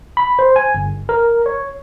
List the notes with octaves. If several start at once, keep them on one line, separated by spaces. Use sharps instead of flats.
B5
C5
G#5
G1
A#4
C#5